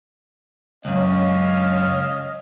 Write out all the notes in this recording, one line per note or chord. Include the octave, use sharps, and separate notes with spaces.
C#2 F#2 C#4 D#5 F5